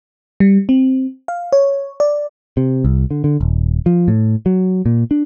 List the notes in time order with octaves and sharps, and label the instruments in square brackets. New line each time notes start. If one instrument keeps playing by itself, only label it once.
[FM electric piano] G3
C4
F5
C#5
D5
[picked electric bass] C3
C2
D3
D3
D#1
F3
A2
F#3
A#2
D4